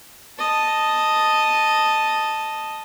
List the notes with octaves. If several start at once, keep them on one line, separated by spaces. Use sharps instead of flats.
D#5 A5